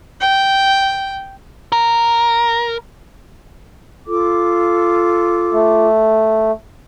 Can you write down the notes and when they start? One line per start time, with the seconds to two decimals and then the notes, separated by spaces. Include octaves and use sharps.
0.20 G5
1.72 A#4
4.06 F4 A4 D6
5.52 A3